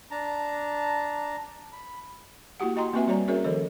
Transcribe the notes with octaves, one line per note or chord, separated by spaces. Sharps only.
D4 A5 A#5
B5
A#3 E4 F#4 G4 F#5
F#4 D#5 G5 A#5 C6
A#3 C4 F#4 B4 E5 G#5
G3 F#4 C#5 D5 A#5
C#4 F#4 G#4 A#4 C#5 E5
D#3 F3 A4 D#5